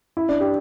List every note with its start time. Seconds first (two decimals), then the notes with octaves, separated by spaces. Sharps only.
0.17 E4
0.29 D4
0.40 G4